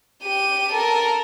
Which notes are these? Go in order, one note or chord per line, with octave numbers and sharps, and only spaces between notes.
G4 D#7
A4 A#4